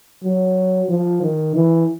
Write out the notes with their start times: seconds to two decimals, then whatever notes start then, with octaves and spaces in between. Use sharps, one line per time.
0.24 F#3
0.89 F3
1.22 D#3
1.55 E3